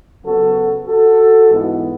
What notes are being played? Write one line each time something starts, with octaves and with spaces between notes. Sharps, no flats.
C#3 F#3 B3 F#4 A4
F#4 A4
G#2 E3 B3